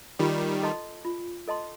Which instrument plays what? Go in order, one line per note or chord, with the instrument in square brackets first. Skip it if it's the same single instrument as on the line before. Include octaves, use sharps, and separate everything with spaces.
[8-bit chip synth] D#3 G3 [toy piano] F4
[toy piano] A4 D#5 A5 C6
F4
A4 D#5 A5 C6